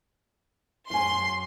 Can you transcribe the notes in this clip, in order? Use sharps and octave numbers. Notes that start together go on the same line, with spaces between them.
F#2 G#5 C6